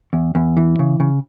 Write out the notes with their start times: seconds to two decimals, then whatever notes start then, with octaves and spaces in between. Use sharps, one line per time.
0.13 E2
0.35 E2
0.57 E3
0.79 C#3
1.00 C#3